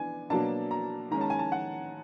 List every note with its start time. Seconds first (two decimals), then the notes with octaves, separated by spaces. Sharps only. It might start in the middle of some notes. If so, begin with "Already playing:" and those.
Already playing: E3 B3 D4 G#5
0.30 B2 F#3 A#3 D4 A5
0.71 A#5
1.11 D#3 G#3 C#4 A#5
1.21 A5
1.30 G#5
1.39 A5
1.52 F#5